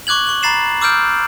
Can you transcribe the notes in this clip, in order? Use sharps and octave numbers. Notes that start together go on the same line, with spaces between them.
C#6 D6 F#6 G#6 F#7
C#6 F#7
A#5 B5 A6 C7 E7
D6 E6 F6 G6 D7